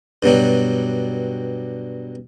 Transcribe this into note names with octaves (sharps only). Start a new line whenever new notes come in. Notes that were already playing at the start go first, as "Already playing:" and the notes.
G2 B2 F#3 G3